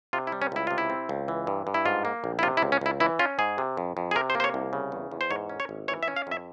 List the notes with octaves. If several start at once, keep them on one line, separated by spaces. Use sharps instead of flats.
C3 F4
E4
G3
C#4
C#2 E4
C3 F4
E4
C4
C#2
E3
G2
G2
E4
G#2 F4
A#3
A#1
E4
C3 F4
E4
C#2
C#4
C#2 E4
E3 E4
C#4 F4
G#2 G#4
C3
F2
F2
G#4
C3 A#4
C5
A#3
C5
C#5
C2
C#3
E2
E2
C5
G#2 C#5
C#4
C#5
G#1
E3 C#5
E5
C#4
F5
F2 E5